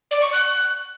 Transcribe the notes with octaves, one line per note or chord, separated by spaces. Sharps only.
D5
C#6
F#6